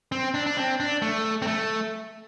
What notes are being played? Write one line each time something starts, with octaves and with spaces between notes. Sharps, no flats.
C4
D4
D4
C4
D4
A3
C4
A3